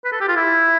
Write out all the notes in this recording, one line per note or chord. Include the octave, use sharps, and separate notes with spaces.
B4
A4
G4
F4
E4